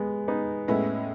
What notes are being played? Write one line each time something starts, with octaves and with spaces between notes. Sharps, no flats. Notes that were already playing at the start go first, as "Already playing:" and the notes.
Already playing: G#3 B3
B3 D#4
A2 G#3 B3 C#4 E4